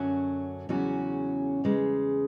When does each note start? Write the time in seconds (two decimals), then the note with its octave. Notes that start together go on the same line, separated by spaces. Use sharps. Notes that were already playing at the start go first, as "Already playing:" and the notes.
Already playing: F#2 D3 F#3 C#4 F#4
0.69 E2 C#3 F#3 C#4 F#4
1.64 E2 C#3 G#3